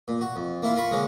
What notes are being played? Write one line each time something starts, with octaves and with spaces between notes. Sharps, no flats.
A#2
F#4
F2
A#3 E4 F4
F4 A#4 B5 C#6
D3 G#3 A#3 C#4